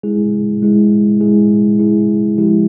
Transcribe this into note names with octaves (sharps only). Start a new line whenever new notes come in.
G#3 E4 G#4
G#3 E4 G#4
G#3 E4 G#4
G#3 E4 G#4
F3 G#3 E4 G4